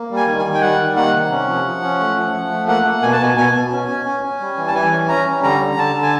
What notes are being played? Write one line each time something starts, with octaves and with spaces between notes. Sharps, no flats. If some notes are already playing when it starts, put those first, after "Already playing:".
Already playing: A#3
G3
G#5
D#3
G#5
D#3
G5
G3 F#5
D#3
A#3 F#5
C3
C#4
F3
F3
C#4
A3
F3
F3
A3
A#3 F#5
A#3
B2 G#5
A5
B2 G#5
B2 G#5
B2
C#4
C#4
C#4
C#4
G3
E3
A5
E3 G#5
C#4
C#4 A#5
G3
D3 A#5
D3
D3 A5
D3
G#5